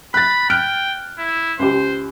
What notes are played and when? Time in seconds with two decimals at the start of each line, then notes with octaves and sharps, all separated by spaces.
0.14 B5 F#6 A6
0.50 G5 F6 F#6 D7
1.18 E4
1.59 C#2 G4 C5